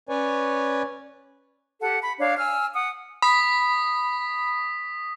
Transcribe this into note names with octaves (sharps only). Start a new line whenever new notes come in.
C#4 B4 C#5 D5 G#5
G4 A4 F#5
B5
D4 C#5 F5
G#5 E6 F6
F#5 D#6
B5 D#6 B6